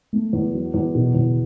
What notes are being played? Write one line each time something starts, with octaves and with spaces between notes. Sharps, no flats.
A3
E2
F#3
E2
B2
E2